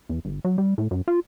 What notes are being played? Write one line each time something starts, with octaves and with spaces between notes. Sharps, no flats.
E2
G1
F#3
G3
A2
F#2
F4